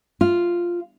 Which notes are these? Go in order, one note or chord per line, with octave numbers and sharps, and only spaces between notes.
F4